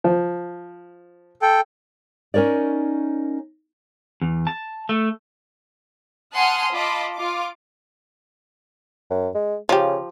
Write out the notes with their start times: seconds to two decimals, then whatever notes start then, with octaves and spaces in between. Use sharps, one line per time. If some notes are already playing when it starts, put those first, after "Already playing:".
0.04 F3
1.42 A4 G5
2.34 C#4 D#4 A#4 C#5 D5
4.21 E2
4.47 A5
4.89 A3
6.34 F#5 G#5 A5 C6 D#6 F6
6.72 F4 D#5 A5 B5 D6
7.15 F4 D6
9.10 F#2
9.35 G#3
9.69 C#3 F3 G4